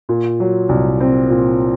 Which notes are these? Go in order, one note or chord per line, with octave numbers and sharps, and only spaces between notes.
A#2
F#3
C2
C4
A#2